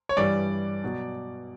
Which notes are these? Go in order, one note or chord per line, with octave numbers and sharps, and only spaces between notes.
C#5
G2 E3 G3 D5
B2 F#3